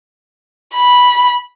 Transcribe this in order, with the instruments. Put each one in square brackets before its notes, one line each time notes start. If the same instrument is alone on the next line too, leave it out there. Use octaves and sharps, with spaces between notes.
[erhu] B5